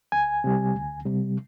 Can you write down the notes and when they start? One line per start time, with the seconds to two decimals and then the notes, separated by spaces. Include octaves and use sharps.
0.12 D2 G#5
0.44 C3 G3
0.75 D2
1.05 C3 G3